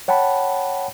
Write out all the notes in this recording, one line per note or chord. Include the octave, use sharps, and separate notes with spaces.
C#5 F#5 G5 A5 B5